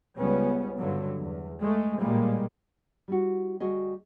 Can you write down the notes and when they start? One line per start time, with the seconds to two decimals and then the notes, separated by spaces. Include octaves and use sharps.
0.18 C#2 C#3 G3 B3 C#4
0.78 G2 D3 F#3
1.21 E2
1.60 G#3 A3
1.99 A1 A#2 G3 G#3 A#3
3.08 G3 E4 F#4
3.60 D2 G3 F#4 G#4 D#5